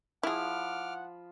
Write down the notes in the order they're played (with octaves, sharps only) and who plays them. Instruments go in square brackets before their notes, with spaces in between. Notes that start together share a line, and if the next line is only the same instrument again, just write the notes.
[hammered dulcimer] F3 B5 [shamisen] E4 G#4 [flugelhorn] F#5 [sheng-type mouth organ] D6 F6